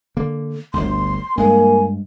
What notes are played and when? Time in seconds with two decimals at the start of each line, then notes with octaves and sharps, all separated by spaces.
0.17 D3 A#3
0.74 G1 D2 C6
1.37 G2 G#3 A#3 G#5